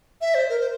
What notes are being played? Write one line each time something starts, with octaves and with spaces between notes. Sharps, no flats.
E5
C5
A#4
C5